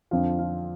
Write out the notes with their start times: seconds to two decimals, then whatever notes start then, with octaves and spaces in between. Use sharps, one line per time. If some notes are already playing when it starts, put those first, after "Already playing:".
0.11 F2 D3 F3 C4 F4 F5
0.39 F4 F5